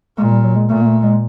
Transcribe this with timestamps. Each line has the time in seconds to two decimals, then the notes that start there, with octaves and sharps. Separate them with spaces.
0.17 A#2 G#3
0.31 G3
0.44 F#3
0.56 G#3
0.69 A#2 A3
0.81 A#3
0.86 A3
1.03 G#3